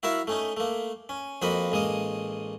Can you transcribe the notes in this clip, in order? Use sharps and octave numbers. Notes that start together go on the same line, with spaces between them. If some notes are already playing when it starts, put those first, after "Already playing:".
E4 F#4 A#4 E5 F5
A3 C#4 D#4
A3 A#3
C#4
F2 F3 A#3 F#4 D#5 B5
A1 G#3 A#3 D#5